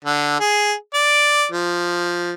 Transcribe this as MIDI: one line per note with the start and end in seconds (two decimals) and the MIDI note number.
0.05 0.38 50
0.40 0.73 68
0.94 1.46 74
1.52 2.34 53